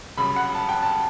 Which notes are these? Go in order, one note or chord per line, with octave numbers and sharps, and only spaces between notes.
F#2 C#3 G3 B5
F#5
A5
G5
A5